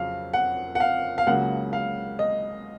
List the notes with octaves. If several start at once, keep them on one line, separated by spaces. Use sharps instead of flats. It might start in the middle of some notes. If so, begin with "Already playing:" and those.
Already playing: F2 C#3 F#3 F5
F#5
F#5
F5
F5
C#2 C#3 F#3 A#3 F#5
F5
D#5